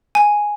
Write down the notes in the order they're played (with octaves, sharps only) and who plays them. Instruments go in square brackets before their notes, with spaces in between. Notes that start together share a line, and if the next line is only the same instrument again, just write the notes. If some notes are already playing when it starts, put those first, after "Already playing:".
[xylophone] G#5